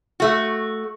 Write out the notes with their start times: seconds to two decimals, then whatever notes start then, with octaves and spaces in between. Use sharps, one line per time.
0.20 A3 F#4